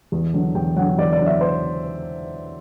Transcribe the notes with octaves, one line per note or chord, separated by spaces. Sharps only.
E2
D3 F#3
E2 G5
D3 F#3 F#5
E2 D5
D5
D3 F#3
E5
C5